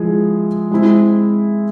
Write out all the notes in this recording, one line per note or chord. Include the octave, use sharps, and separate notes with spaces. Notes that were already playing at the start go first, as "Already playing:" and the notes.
Already playing: F3 G#3 E4 G#4
G#3 C4 E4